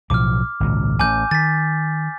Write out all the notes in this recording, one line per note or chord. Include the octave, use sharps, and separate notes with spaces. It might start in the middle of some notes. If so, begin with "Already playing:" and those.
B1 A2 F3 D6 F6
G#1 C#2 A#2
A1 G#5 D6 G6
D#3 A6 B6